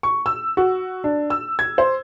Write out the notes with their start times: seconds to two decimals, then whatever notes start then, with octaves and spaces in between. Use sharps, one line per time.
0.03 C#6
0.26 E6
0.57 F#4
1.04 D4
1.30 E6
1.59 G#6
1.78 C5